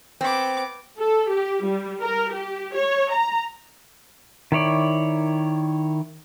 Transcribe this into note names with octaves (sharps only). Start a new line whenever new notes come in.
B3 C4 D6
A4
G4
G3
A#4
G4
C#5
A#5
D#3 E4 C#5 D5